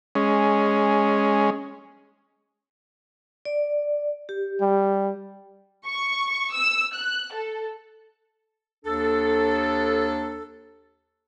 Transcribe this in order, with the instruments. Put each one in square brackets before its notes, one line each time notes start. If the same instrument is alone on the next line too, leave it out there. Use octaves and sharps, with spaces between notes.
[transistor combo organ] G#3 C#4
[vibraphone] D5
G4
[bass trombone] G3
[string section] C#6
E6
F#6
A4
[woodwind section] D#2 D4 A4